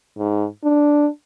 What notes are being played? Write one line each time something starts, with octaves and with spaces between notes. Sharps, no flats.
G#2
D4